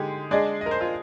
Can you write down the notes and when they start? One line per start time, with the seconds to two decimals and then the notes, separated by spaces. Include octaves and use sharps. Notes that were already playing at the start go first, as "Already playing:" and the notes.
Already playing: D3 G#3 D#4 G4 G#4
0.31 G#3 D4 G#4 D5 D#5
0.61 D#5
0.66 A#4
0.71 C5
0.81 F4